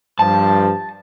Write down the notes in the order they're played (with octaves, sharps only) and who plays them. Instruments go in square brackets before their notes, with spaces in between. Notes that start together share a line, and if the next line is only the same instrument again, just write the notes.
[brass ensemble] G2 F3 [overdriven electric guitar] A5